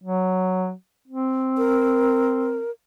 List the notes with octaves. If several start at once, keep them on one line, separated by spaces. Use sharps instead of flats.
F#3
C4
A#4